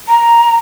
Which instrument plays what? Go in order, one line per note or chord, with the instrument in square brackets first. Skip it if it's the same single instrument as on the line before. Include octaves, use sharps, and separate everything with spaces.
[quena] A#5